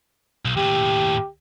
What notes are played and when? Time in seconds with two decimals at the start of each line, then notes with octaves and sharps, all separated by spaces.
0.45 B1
0.57 D#2 A2 G4